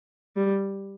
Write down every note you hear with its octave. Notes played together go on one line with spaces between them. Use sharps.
G3